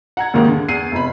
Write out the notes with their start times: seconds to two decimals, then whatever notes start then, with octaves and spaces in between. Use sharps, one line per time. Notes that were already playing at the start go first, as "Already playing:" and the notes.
0.17 F#5 A#5 G#6
0.34 D#2 G#2 D#3 A#3
0.48 D3
0.68 E2 C7 D#7
0.92 F1 B5